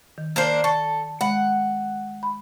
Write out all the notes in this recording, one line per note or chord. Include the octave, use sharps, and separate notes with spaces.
D#3
A#3 D4 C5
A4 C#6
G#3 F#5 B5
B5